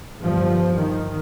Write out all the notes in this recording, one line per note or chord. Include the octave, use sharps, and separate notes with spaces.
G1 G2 F3
D#3